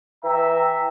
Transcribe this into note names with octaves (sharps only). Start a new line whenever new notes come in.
E3 E5 G5 A#5